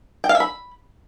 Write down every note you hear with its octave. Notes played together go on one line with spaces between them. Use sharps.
G5
F5
E5
B5